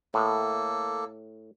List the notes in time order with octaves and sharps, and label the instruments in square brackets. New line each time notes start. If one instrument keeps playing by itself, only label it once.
[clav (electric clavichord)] A2 [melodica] A#3 A4